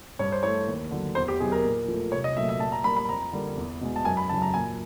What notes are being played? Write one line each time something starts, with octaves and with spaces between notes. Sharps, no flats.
G2 C#5
C5
E3 A3 C#5
D#2
D3 F#3
E2 C5
G4
B2 F#3 G#4
A#4
A#2
F3 A3
C2 C#5
D#5
A#2 F#3 A3 E5
E5
A#2 A5
A#5
G3 A#3 B5
B5
F2 A#5
D3 G3 A#3
E2
B2 G#3
A5
F#2 G#5
B5
C#3 F#3 A5
A#5
A#2 G#5